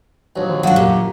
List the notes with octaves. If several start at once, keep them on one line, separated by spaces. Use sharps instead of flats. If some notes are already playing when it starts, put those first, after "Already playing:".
A#1 D#2 F#3
D#3
F#2 D4 F4 F#4 F5 F#5
A#2 G4